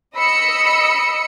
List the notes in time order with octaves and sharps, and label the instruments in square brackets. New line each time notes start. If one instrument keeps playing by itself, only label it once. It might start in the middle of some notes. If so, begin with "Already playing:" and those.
[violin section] D#5 B5 E6 C#7